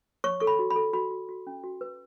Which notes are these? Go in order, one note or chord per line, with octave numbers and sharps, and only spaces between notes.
C#5 C#6
A4 C#6
B5
F#4
B5
A4
F#4 B5
F#4
F#4
C#4
F#4
B4